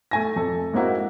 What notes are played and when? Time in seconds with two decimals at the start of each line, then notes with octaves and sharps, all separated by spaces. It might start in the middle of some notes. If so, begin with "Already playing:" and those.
0.11 A3 G#5 A#6
0.36 F2 A4
0.73 G#3 A#3 C4 E4 F#4